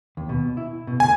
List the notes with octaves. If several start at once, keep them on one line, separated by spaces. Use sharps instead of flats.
D#2
B2
E4
B2
D2 G#5